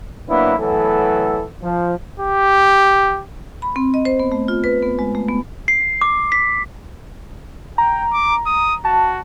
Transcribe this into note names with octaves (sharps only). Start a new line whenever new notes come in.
F#3 A#3 B3 D4 E4
A2 E3 F#3 B3 A4
F3
G4
B5
C4
D#5
C5
B3
A3
F4
B4
B3
G#3
A3
B3
C7
D6
B6
G5 A#5
D6
D#6
F#4 A5